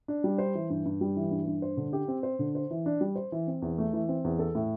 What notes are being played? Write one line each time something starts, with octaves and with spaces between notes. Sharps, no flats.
D4
G3
C5
E3
G2
G2
G3
E3
G2
G2
C5
D3
G4
C4
C5
D3
C5
E3
D4
G3
C5
E3
C4
E2
A3
E3
C4
E2
A4
A2